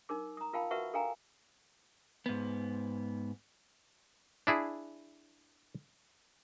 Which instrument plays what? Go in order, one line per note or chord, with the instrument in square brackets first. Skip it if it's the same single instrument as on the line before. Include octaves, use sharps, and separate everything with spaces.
[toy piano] D#4 A#4 D6
A#5 D#6
F4 A#4 F5 G5 A5 B5
F#4 A#4 B4 E5 F#5 C#6
A4 A#4 F5 G5 G#5 A#5
[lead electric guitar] G#2 B3
[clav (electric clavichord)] D4 E4 G#4